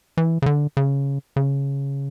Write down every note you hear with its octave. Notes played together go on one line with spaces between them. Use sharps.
E3
C#3
D3
C#3
C#3